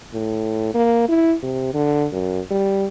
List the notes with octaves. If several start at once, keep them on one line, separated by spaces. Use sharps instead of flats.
A2
A#3
E4
C3
D3
F#2
G3